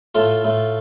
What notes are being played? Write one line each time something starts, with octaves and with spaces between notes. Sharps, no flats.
A2 F4 A4
A2